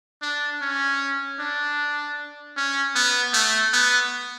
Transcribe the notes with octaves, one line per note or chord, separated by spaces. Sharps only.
D4
C#4
D4
C#4
B3
A3
B3